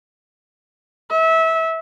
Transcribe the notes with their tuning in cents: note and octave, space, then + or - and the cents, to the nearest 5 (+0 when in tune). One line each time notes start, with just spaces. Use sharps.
E5 -25